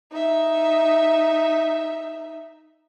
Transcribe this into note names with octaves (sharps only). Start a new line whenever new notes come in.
D#4 E5